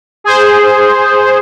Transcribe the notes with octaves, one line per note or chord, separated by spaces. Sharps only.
G#4 C5